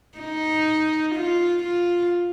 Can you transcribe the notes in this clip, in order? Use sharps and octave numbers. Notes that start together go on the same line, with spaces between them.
D#4
F4
F4